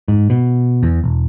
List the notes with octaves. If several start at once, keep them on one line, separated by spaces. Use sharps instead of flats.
G#2
B2
E2
E1